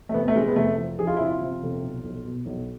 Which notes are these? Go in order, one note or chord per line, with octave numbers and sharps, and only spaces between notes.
A3
C3 B3
A3
C3 G#3
B3
F1 A3
F3
F3 G#4
F4
E4
C3 F4
C3
F1
B1
B1
B2
B1